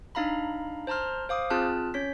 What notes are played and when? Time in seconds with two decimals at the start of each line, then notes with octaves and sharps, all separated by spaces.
0.15 D4 D#4 F5 A#5 B5
0.87 C5 A5 A#5 C6 F6
1.29 C5 F5 D6 D#6
1.50 C4 F4 G#4 A5 F6 F#6
1.94 C#4 C#5 G6 B6